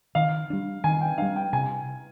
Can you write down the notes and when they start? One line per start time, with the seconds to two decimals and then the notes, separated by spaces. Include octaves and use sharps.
0.15 D#3 F5
0.50 G3 D4
0.84 D#3 G#5
1.01 G5
1.18 G3 D4 F5
1.36 G5
1.53 C3 G#5